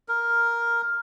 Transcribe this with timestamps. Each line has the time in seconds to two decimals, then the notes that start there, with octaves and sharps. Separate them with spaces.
0.08 A#4